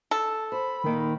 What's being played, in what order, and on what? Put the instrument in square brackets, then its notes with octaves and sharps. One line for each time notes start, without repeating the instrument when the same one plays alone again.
[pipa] A4
[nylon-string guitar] C5 [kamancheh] B5
[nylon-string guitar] A#2 A#3 [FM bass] D#3